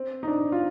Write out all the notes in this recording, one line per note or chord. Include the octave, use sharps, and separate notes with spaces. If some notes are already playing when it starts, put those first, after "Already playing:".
Already playing: C4
D#4
D4
F4